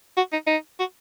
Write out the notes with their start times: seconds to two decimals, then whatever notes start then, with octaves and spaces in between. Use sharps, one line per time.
0.17 F#4
0.32 D#4
0.47 D#4
0.79 F#4